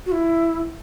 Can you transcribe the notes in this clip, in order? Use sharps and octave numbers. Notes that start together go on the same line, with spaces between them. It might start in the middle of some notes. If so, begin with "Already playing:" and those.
F#4
E4